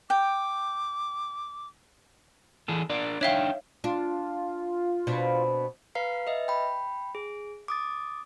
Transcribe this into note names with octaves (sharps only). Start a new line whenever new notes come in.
G5 D6
E3 G#4 A4
D4 A#4 D5
D4 D#4 C#5 E5 F5 G5
D4 F4
B2 C4 D4
B4 F5 A#5 C7
B4 D#5 E5
G5 B5
G#4
D6 D#6 A6